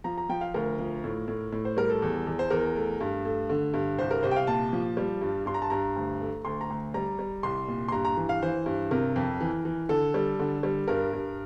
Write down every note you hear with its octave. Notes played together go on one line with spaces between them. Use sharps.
F3 A#5
A#5
F3 G5
F5
D2 A#4
F3
A2
A2
A2
C5
G3 A#4
A4
E2
E2
C5
E2 A#4
A3
G2
A3
D3
G2
C2 C5
A#4
C2 C5
G5
F5
A#2 A5
F3
G3
G2
G2 C6
A#5
A5
G2 A#5
D2
A3
D2 C6
A#5
D2
G3 A#5
G3
C2 C6
A#2
C6
G2 A#5
A#5
E3
F5
E3 C5
G2
C3 A#4
F2
E3
E3
D3 A4
G3
D3
G3
G2 A#4
G2